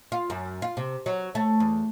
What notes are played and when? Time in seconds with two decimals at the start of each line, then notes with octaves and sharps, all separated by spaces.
0.12 F4
0.30 F#2
0.62 F4
0.77 C3
1.06 F#3
1.35 A3
1.60 E2